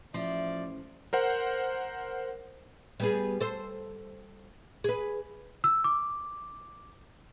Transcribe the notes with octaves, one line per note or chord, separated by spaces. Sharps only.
A1 F3 D5 E5
A#4 C5 F#5
G3 B3 G#4
A4 C5
G#4 B4
E6
D6